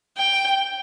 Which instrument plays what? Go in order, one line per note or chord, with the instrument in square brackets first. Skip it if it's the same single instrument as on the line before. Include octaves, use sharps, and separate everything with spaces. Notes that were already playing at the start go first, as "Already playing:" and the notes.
[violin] G5